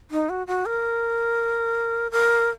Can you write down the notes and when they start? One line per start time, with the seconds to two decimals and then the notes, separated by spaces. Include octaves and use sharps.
0.11 D#4
0.29 F#4
0.47 F#4
0.66 A#4
2.12 A#4